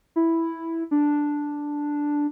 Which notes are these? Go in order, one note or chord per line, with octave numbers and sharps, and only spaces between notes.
E4
D4